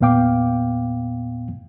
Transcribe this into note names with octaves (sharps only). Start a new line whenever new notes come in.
E2 A#2 B3 F5 G5 D6